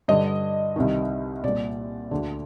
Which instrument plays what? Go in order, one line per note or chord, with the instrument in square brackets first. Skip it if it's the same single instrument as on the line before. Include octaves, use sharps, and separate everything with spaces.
[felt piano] G2 D3 D#5
C2 C3 D#3
C2 A#2 D5
D2 D3